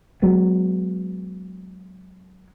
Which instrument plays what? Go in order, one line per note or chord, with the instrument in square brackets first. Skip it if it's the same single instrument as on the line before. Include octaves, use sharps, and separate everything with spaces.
[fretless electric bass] F#3 G#3 B3